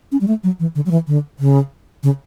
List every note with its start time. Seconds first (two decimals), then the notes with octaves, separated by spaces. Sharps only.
0.12 C#4
0.21 G3
0.28 A3
0.44 F#3
0.60 E3
0.75 D3
0.86 F#3
0.91 E3
1.07 D3
1.39 C#3
2.03 C#3